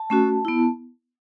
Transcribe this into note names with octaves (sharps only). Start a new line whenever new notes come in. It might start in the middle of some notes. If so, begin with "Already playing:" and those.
Already playing: A5
A3 C#4 F#4
B3 E4